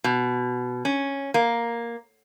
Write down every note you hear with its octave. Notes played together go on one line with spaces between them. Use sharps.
B2
C#4
A#3